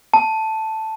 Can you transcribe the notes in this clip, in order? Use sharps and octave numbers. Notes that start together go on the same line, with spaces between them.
A5